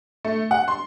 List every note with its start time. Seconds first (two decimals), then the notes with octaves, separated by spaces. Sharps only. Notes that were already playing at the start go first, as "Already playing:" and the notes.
0.25 A3
0.51 F#5
0.68 C6